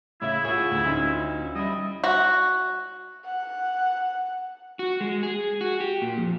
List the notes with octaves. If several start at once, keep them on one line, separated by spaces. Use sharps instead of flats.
A2 C#3 E4 E5
F4 F#4 G#4 C#5
D2 A3
C#4 D#4 F4
G3 E4 D#5
F#4
F#5
F#4
G#3
G#4
F#4
G4
A#2
F2